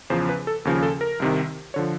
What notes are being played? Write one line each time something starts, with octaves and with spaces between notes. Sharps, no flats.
E2 C#3 F3 C5
B4
A4
D#2 C#3 F3
A4
A#4
C2 C3 D#3
D3 F3 C#5